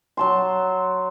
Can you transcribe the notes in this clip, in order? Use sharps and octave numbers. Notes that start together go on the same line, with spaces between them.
F#3 A5 C6